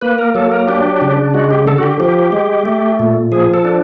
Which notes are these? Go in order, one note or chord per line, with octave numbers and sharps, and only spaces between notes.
A#3 B4
A#4
F#3 A4
A#4
D4 G4
C#3
G#3 F#4
G4
D3 A4
F#4
G4
F3 G4
G#3
A3
A#2
F3 G#4
A4
D4